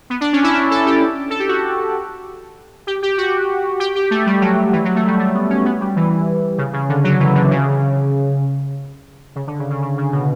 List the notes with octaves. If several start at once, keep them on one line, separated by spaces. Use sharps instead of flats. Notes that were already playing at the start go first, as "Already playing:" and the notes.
B3
D4
C#4
E4
D4
A4
G4
A4
G4
F#4
G4
G4
F#4
G4
G4
A3
G3
F#3
F#3
E3
F#3
A3
G3
A3
B3
C#4
B3
G3
E3
C#3
C#3
D3
F#3
E3
D3
C#3
C#3
D3
C#3
C#3
C#3
C#3
B2